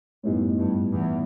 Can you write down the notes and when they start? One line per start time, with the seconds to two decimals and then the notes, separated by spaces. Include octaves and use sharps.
0.23 F#2 A2 G3 B3 D#4
0.59 G2
0.92 E2